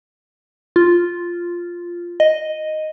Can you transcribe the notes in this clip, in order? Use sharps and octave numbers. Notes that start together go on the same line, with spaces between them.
F4
D#5